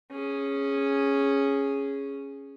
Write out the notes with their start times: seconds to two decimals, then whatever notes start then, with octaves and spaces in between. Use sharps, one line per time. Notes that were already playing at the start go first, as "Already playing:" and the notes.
0.12 C#4 G#4